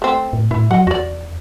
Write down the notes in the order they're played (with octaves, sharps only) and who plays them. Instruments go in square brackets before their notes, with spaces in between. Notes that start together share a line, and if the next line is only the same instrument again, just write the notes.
[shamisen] A3 C4
[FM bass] A2
[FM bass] A2 [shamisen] E4
[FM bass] F#3 [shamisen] D#5 F#5
[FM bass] E2 [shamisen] F#4 D5